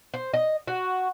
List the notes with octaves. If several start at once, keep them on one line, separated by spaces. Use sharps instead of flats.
C5
D#5
F#4